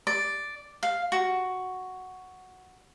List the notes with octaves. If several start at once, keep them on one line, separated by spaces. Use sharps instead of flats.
D5
F5
F#4